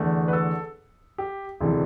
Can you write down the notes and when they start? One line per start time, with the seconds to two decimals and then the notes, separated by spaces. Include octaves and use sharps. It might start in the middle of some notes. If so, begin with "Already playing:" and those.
Already playing: E2 D3 A3
0.28 B4
0.33 A4
1.18 G4
1.60 E1 D2 C3 E3